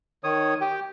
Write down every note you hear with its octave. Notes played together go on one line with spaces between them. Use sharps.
D#3 C#5 D#6
G4 G5